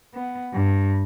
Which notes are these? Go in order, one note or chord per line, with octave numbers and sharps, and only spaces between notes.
B3
G2